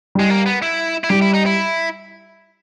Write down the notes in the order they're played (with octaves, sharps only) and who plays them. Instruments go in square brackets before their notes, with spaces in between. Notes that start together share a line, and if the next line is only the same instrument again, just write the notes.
[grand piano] G3 [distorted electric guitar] G#3
[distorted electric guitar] A#3
B3
E4
E4
[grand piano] G3 [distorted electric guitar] G4
[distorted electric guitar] E4
D#4
E4